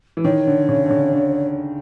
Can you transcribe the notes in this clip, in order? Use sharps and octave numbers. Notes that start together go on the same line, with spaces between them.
E3
D#3 C#5
D3
C#3
D3
C#3
D3